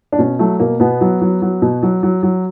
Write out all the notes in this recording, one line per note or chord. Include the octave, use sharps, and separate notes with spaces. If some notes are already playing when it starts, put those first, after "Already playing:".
D4
B2 C#4
F#3 A3
B2 A#3
B2 B3
F#3
F#3
F#3
B2
F#3
F#3
F#3